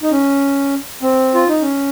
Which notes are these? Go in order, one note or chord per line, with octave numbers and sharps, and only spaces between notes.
D#4
C#4
C4
F4
D#4
C#4